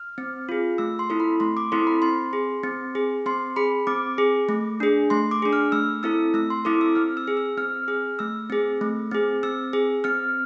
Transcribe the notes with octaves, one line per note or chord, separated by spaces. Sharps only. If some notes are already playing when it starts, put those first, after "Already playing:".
Already playing: F6
C4
F4 G#4
A3 E6
C6
C4 E4 A4
B5
A3 C6
D6
C4 E4 A4 C6
B5
C4 C6
G#4
C4
G#4
C4 C6
G#4 B5
C4 D6
G#4
A3
D4 G#4
A3 C6
D6
D4 G#4
F6
A3 E6
C4 E4 A4 E6
A3 E6
C6
C4 E4 A4 D6
E6
C4 F6
E6
G#4
E6
C4 F6
G#4 F6
A3 E6
C4 G#4
A3
C4 G#4
C4 E6
G#4
C4 F6